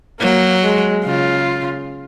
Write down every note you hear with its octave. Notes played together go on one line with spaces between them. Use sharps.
F#3 A#3
G#3
C#3 F4